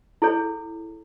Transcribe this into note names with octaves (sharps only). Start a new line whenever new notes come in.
E4 G#4 A4 C#5